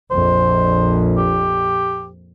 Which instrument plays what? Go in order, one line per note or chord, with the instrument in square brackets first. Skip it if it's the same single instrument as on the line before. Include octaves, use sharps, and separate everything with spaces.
[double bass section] A#1 F2 [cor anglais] C5
[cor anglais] G4